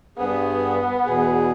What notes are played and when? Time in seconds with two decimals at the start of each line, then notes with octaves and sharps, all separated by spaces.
0.17 G2 B3 G#4
1.06 E2 B2 G#4